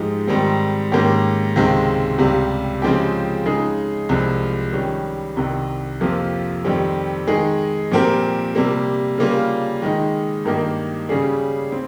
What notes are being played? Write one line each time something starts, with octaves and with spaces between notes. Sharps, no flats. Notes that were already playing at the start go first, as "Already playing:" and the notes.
Already playing: G#2 F3 G#3 D#4 G4
G#2 D#3 G3 C4
G#2 D#3 A#3 C#4 G4
C#2 C3 D#3 G#3 C4
C#2 C3 G3
C#3 F3 G#3 C4 G4
C#3 G#3 D#4 G#4
C2 C3 F3 G#3
D#3 G3 C#4
C2 C3 D#3
F2 C3 F3 A#3 F4
F2 D#3 G3 C4
D#3 G#3 D#4 G#4
A#2 F3 C4 G4 A#4
C3 G3 A#3
C#3 G3 A#3 F4
D#3 G#3 D#4
G2 D#3 A#3 D#4 G4
C#3 G3 C#4 G#4
C4